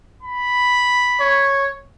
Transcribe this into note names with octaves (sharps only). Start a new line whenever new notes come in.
B5
C#5